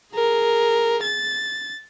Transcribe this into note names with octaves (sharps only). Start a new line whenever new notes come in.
G#4 A#4
A6